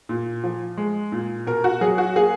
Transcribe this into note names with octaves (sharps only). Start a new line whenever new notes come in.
A#2
F3
G#3
A#2
B2 A#4
F#4
F#3 G#4
F#4
A#3 G#4